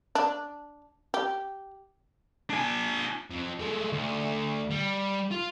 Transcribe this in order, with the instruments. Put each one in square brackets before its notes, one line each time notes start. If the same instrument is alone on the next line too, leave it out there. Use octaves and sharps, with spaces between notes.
[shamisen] D4
G4
[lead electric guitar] D4 G#5
[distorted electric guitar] F2
G#3 A3
D2
G3
F4